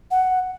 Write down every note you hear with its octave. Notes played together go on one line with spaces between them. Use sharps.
F#5